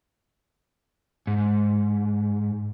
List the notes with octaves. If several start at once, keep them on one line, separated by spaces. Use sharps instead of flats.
G#2